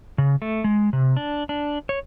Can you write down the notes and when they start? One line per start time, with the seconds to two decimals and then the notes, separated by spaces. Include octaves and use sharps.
0.18 C#3
0.42 A3
0.64 G#3
0.93 C3
1.17 D4
1.49 D4
1.89 C#5